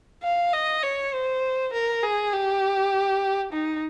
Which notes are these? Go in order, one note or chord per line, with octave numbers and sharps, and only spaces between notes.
F5
D#5
C#5
C5
A#4
G#4
G4
D#4